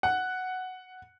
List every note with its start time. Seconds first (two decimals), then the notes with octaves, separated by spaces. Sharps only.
0.03 F#5